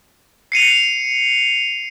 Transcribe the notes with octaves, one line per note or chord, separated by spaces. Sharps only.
C7 C#7 D#7 F7